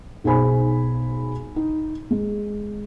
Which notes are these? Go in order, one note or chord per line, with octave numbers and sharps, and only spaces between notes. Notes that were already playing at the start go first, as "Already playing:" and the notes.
B1 D#4 G#4 C5 G#5 B5
D#4
G#3